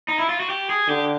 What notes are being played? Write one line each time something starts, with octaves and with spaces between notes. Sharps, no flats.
D#4
E4
F4
F#4
G4
G#4
D3 G4